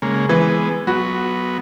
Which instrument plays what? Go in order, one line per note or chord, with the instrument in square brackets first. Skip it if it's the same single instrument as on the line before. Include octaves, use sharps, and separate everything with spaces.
[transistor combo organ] C#3 G#3 A#3
[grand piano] E3 [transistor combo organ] G#3 B3
[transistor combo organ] F#3 B3 [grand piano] F#4